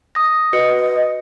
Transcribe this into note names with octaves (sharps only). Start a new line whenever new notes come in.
D#6 A#6
F#4 B4 D#5 C#7